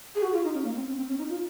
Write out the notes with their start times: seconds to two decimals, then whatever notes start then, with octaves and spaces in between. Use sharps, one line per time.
0.15 G#4
0.22 F#4
0.32 F4
0.44 D#4
0.54 C#4
0.64 A#3
0.75 C4
0.86 C#4
0.97 C4
1.07 C#4
1.18 D#4
1.29 F4